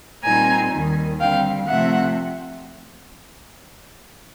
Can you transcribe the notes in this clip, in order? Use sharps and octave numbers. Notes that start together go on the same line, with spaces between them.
A#2 G3 C4 D#4 G#5 A#5
D#2 D#3 G3
D3 G3 C4 F5 G5
C3 F3 A3 C4 E5 F#5